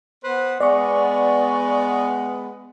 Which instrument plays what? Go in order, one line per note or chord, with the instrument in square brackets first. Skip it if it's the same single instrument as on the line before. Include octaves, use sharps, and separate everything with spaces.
[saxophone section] B3 B4 C5
[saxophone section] G#3 B3 [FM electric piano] D5 C#6